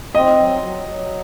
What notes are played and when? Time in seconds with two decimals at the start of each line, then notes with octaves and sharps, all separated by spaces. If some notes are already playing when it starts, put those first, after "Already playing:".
0.15 C4 D#5
0.39 F#3
0.64 F#3
0.89 F#3